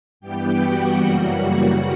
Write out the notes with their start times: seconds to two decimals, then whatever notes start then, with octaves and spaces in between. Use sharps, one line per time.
0.20 G2 E3 G3 B3 G4 G5
0.57 F#4 F#5
0.94 F#2 C#3 E3 G3 A#3